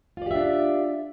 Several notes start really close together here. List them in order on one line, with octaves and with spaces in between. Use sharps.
F4 D5 G4 E5 D4